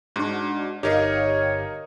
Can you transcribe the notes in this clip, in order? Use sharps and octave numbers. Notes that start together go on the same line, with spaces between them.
G#2 D4 F#4
G1 D#4 G4 A#4 C#5 D#5 F5